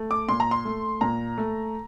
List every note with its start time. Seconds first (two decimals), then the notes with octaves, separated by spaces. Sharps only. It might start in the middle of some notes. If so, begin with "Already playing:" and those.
Already playing: A3
0.11 D6
0.29 A#2 C6
0.40 A#5
0.51 C6
0.65 A3
1.01 A#2 A#5
1.38 A3